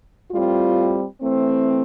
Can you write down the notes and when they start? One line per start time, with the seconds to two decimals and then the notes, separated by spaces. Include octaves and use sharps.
0.31 A2 G3 C4 F4
1.21 E3 A3 C4